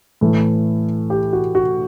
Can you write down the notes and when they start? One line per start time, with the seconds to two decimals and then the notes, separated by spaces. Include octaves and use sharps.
0.21 A2 E3 A3
1.10 G4
1.33 F#4
1.55 F#4